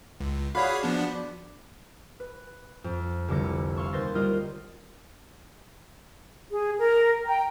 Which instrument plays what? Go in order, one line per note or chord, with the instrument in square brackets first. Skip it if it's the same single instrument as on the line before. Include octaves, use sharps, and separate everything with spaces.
[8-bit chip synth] C#2
[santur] F#4 B4 D5 [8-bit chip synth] G#4 C#5 F5
[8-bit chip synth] F3 B3 D4
[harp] B4
F2
F1 C2 D3 D6 A#6 C#7
F5 C6 C#6 E6
D#2 B4 C5 C6 A6 A#6
G3 F4 A#4 D#5
[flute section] G#4
A#4
G5 A#5